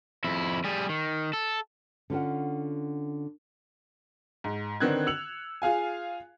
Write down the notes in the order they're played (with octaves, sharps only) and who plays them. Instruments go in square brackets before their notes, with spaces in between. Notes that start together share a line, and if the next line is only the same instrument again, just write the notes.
[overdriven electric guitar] F2 E4
G3 G#4
D#3
A4
[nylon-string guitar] D3 C#4 F4 F#5
[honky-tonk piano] G#2
D3 D#3 B3 C4 F#6 G#6
E6 C#7 F7 F#7
F4 G#4 F5 G#5